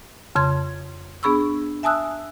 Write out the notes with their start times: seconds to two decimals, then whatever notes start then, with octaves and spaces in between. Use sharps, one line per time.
0.35 F2 C#3 C6 G#6
1.23 B3 D4 G#4 B5 C#6 E6
1.83 E5 G#5 A5 D#6 E6 F#6